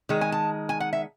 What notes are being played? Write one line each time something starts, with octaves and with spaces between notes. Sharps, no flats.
D#3 G#3
G#5
A5
G#5
F#5
E5